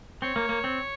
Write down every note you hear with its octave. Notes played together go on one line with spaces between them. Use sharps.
C4 C#5
A#3
A#3
C4